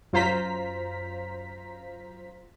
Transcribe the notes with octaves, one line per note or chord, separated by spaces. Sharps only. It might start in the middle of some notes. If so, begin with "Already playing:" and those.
F#2 F4 C5 A#5 B6